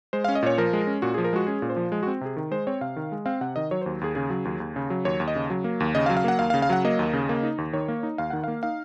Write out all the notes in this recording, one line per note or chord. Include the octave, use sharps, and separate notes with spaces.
G#3 C5
F5
C#4
D#5
A#2 C#5
F3 A#4
G#3
C#4
A#2 F#4
G#4
F3
A#4
G#3 F#4
C#4 G#4
A#2
C5
F3
G#3
F#4
C4
C3 G#4
D#3
G#3 C5
C4 C#5
C3 F5
D#3
G#3
C4 F5
C3 F#5
D#3 D#5
F#3 C#5
C5
D#2
D#2 G#4
C#3 G#4
F#3
D#2
D#2
C#3
F#3
D#2 C#5
D#2
D#5
C#3
F#3
A#3
D#2
C#3 D#5
F5
F#3
F5
A#3 F#5
D#2 F5
F5
C#3
F5
F#3 F#5
A#3 D#5
D#2
C#3
A#3
D#4
D#2
D#3 C#5
A#3
D#4
D#2 F5
D#3 F#5
A#3 F5
D#4 F5